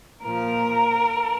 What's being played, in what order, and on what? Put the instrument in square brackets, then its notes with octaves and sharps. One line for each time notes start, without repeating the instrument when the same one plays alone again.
[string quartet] A#2 F3 A#4